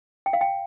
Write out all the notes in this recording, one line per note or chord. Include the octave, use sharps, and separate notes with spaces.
G5
F5
G5